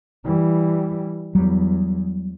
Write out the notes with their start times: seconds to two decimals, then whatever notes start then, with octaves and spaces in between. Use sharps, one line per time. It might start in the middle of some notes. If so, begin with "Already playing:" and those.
0.24 E3 G3
1.35 E2 F#3 G3